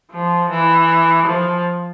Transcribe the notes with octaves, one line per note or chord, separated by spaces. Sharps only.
F3
E3
F3